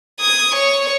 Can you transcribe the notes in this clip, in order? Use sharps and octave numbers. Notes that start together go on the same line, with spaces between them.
D#6 G#6
C#5 C#6